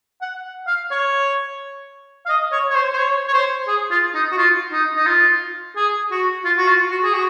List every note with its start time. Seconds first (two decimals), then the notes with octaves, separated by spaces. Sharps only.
0.22 F#5
0.67 F5
0.91 C#5
2.26 F5
2.29 D#5
2.52 C#5
2.71 C#5
2.75 C5
2.93 C5
2.98 C#5
3.28 C#5
3.34 C5
3.68 G#4
3.91 F4
4.15 D#4
4.32 F#4
4.38 F4
4.72 D#4
4.96 D#4
5.06 F4
5.76 G#4
6.11 F#4
6.45 F4
6.57 F#4
6.68 F4
6.91 F#4
7.04 G#4
7.14 F#4